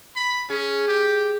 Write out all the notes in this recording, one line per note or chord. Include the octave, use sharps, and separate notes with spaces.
B5
C#4 G#4
G4